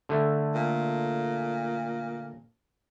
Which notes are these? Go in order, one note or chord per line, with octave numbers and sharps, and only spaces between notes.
D3 A3
A#2